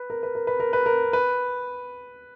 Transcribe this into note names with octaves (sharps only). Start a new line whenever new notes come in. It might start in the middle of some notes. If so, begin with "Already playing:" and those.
Already playing: B4
A#4
B4
A#4
B4
A#4
B4
A#4
B4